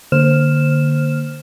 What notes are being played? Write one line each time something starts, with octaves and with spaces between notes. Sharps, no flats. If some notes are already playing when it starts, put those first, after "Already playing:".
D3 A#3 C5 F6 E7